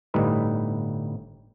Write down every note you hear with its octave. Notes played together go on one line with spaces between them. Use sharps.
G1 A2 G3 D#4 B4